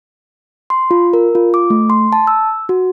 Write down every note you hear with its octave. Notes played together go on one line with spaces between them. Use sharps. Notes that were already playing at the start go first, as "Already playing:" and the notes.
C6
F4
A#4
F4
D6
A3
C6
A5
E6
F#4